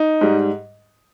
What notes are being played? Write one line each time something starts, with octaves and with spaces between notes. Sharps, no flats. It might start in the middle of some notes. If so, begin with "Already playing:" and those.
Already playing: D#4
G#2 G3